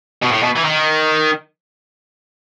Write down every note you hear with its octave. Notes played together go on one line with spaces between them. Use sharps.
B2
A2
B2
E3
D#3